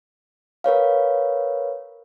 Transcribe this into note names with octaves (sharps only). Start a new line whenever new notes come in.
A#4 B4 C#5 F5